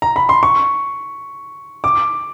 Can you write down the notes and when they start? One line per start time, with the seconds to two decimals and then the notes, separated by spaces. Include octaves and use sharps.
0.02 A#5
0.16 B5
0.29 C6
0.43 C#6
1.84 D6